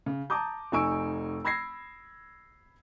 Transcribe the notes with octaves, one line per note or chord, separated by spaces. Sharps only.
C#3
A5 A#5 D6 D#6 G6
F1 D#4 G#5 C#6 E6 D7
B5 E6 G#6 A#6 C7